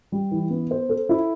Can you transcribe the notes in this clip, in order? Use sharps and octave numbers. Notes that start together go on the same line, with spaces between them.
G3
E3
B3
C5
A4
E4